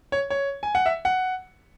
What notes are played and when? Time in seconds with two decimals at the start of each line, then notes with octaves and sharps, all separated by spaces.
0.12 C#5
0.30 C#5
0.63 G#5
0.75 F#5
0.86 E5
1.05 F#5